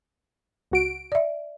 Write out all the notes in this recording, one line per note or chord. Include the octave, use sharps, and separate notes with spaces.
C#2 F#4 D7
D5 E5